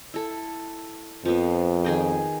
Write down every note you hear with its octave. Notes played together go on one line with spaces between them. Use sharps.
E4 A4
F2 F3 B3
D#3 G#4 G5